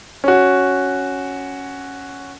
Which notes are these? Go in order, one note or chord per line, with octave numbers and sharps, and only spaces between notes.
C#4 F#4